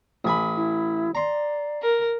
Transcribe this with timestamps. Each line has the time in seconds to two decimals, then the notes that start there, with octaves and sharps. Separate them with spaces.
0.25 A1 G#5 B5
0.56 E4
1.15 D5 A#5 C6
1.82 A#4